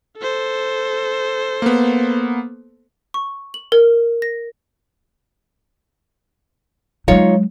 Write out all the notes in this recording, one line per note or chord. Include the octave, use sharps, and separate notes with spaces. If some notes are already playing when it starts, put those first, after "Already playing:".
A4 C5
A#3 B3
C#6
F#7
A#4
A#6
F#3 G#3 D#4 F4 C#5